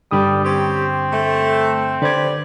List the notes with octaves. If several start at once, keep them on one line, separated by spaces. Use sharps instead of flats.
G2 D3 G3 D#6
C4 C#4 G4
A3
D3 G4 B4 C5 D5 G#6